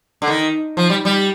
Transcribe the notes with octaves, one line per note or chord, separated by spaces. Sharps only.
D3
D#3
F3
G3
G3